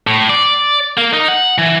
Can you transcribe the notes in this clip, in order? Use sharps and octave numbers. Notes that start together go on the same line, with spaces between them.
A2
D5
A#3
D#4
F#5
E3